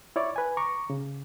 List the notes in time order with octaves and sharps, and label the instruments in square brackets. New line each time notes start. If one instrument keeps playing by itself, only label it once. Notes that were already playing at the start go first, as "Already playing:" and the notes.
[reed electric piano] E4 C#5 D5
B4 G#5
A#5 C#6 D6
C#3